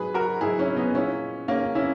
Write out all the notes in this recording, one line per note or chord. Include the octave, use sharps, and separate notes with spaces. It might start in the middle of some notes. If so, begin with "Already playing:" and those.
Already playing: G#2 F#3 G#4 B4
F#4 A#4
G#2 F#3 E4 G#4
C#4 E4
B3 D#4
A#2 G#3 C#4 E4
A#2 G#3 A#3 C#4
C#4 E4